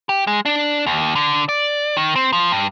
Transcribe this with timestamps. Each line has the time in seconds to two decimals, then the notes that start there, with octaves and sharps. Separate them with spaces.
0.09 G4
0.27 G#3
0.46 D4
0.86 D#2
1.15 D3
1.49 D5
1.97 D#3
2.15 C4
2.33 F3
2.52 G2